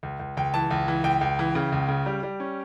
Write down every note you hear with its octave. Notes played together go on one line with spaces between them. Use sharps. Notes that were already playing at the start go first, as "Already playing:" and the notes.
C#2
C#2
C#2 G5
E3 A5
C#2
E3
C#2 G5
C#2
E3
C#3
C#2
C#3
G3
G3
C#4